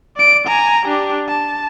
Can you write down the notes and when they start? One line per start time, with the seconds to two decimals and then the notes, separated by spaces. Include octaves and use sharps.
0.17 D5 D7
0.47 G#5 A#5
0.86 D4 G4
1.28 A5